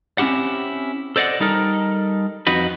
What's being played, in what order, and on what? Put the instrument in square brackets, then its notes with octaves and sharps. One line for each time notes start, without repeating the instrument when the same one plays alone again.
[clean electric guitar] C4 C#4 E4 G4 F#5
A4 C5 D5 D#5 F#5
G3 D#4 A4 A#4
F2 D#4 F#4 B4